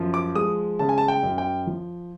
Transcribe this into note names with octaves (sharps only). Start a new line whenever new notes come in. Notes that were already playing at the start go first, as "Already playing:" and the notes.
Already playing: F#2 F3
D6
G#3 D#6
C#3 A5
G#5
A5
G5
F#2
G5
F3